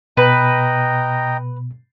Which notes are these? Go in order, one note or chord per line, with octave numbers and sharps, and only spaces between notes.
B2 B4 D#5 G5 A#5